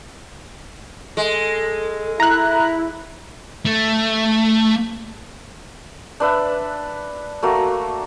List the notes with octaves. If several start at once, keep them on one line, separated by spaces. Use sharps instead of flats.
G#3 A4
E4 A#5 F#6
A3
D4 B4 E5
A3 A#3 F#4